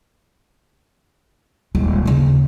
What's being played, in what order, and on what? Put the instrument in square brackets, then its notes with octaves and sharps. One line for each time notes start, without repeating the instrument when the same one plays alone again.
[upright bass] D#1 G#3
D#2 C#3